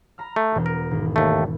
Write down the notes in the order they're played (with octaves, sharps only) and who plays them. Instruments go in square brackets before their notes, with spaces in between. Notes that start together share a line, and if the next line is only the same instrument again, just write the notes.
[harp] A#5 B5 F6
[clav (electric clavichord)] A3
[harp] E1 F#4
[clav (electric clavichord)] A#4
[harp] G#1
[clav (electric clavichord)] D#2 A3